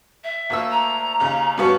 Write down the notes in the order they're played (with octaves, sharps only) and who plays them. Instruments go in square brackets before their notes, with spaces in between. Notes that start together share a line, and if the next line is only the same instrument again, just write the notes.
[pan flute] E5
[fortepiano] D2 A#3 E6
[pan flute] A#5
[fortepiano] D#2 C#3
[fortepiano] G2 B3 C#4 [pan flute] F#4